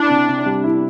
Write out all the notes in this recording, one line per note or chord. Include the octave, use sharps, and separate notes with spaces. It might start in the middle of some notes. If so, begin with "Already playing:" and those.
Already playing: D4 E4
C3
C3
G3
E4